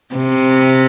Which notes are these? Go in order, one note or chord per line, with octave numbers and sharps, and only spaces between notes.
C3